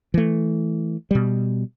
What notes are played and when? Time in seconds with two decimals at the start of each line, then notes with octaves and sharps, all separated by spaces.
0.14 E3 A3
1.11 B2 G3